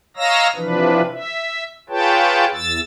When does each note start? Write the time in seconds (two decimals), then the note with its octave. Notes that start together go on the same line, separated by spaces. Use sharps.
0.17 C#5 D#5 F5 A#5 E6 A#6
0.56 C3 E3 F3 D4 B4
1.12 E5
1.89 F4 G#4 B4 C#5 G5 A5
2.54 E2 E6 A6